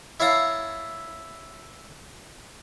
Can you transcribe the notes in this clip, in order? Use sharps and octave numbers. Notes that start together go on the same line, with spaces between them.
E4 C#5 E5 F5 A5 A#5